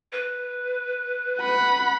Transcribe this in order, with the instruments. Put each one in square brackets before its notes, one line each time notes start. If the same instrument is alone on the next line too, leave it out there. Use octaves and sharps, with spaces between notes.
[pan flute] B4
[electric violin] F#5 B5